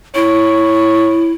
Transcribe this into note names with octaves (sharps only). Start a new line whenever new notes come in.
E4 C#5